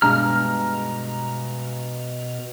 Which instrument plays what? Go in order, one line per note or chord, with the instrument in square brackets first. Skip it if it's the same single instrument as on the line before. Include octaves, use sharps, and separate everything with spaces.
[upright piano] G2 G#3 [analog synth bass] B2 [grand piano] A#5 [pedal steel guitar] F6